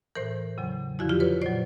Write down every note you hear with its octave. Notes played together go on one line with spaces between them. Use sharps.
A2 E3 A#4 C5
E2 C#3 F#3
F2 D3 F3 E4 F#4
F4 G4
B4 C#5
A#2 F#3 C5 D5